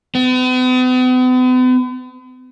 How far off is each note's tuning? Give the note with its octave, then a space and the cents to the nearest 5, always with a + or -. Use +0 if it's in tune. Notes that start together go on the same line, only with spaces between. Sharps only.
B3 +45